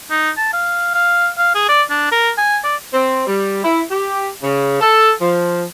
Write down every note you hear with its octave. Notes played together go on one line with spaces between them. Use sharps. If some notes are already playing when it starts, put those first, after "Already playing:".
D#4
A5
F5
F5
F5
G#4
D5
D4
A#4
G#5
D5
C4
G3
E4
G4
C#3
A4
F3